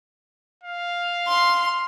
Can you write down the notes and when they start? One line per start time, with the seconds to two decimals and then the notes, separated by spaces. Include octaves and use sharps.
0.63 F5
1.27 C6